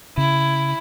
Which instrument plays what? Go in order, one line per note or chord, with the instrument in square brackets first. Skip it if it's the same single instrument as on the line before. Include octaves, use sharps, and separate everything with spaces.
[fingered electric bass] C#3 [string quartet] E4